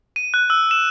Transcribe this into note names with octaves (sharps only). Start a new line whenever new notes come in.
D#7
F#6
E6
E7